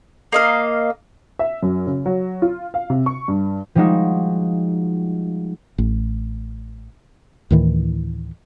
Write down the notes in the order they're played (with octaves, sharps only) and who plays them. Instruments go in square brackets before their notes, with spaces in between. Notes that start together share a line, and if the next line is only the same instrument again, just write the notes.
[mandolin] A#3 D#5 F5
[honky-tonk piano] E5
F#2
C#3
F#3
F4
F5
C3
C#6
G2
[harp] F3 G3 G#3 D#4 F#4
[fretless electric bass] A1
D2 A2 D#3 E3